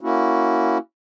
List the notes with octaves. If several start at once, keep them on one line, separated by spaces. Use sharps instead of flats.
A#3 C#4 E4 F#4